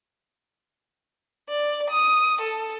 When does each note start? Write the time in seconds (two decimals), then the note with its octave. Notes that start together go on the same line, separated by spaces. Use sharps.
1.49 D5
1.90 D#6
2.41 A4